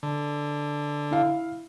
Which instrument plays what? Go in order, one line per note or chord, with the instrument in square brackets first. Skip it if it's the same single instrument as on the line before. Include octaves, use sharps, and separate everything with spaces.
[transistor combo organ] D3
[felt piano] E4 F5